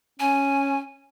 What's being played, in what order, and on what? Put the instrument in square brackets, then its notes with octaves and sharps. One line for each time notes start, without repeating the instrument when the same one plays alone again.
[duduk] C#4 [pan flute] G#5